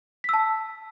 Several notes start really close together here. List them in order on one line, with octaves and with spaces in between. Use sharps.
B6 E6 A5